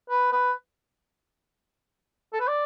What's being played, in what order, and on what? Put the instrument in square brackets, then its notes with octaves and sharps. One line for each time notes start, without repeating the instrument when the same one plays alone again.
[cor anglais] B4
B4
A4
B4
D5